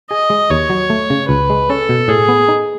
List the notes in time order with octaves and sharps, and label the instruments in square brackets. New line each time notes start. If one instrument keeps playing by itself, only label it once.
[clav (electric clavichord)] G#4 [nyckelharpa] D#5
[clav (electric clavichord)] G#3
[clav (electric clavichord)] D#2 [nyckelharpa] C#5
[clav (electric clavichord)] F#3
A3
C#3
[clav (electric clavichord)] C#2 [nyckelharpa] B4
[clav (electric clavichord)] G#3
[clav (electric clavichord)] C#4 [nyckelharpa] A4
[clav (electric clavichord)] B2
[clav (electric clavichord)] A2 [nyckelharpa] G#4
[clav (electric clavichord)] B3
D#4